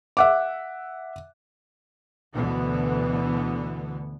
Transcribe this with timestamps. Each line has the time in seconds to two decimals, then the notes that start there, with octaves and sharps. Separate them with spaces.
0.17 E5 F#5 D6
2.34 D2 B2 D3 E3 B3